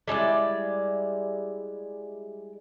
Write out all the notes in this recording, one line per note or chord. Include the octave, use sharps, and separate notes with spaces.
G3 G#3 E4 D5